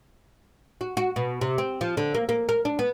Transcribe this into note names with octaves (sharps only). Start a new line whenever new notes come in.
F#4
F#4
B2
C3
C4
F3
D3
A#3
A#3
A#4
D4
B3